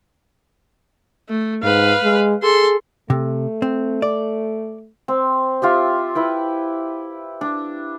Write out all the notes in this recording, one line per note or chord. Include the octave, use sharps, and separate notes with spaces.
A3
G#2 B4 F5
G#3
G#4 A4 C6
C3 A3
C4
D5
C4
F4 G4 E5
E4 B4 G5
D4